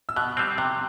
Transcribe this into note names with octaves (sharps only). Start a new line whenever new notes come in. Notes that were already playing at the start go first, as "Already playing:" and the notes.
E6
B2 F#6
G3 C4 E6
C3 F#6